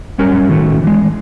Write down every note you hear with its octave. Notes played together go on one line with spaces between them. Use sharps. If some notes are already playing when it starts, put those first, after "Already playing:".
F#2 G3 C#4 A#4 C#5
A2 D#3 A3 C#4 F#4
E3 G#3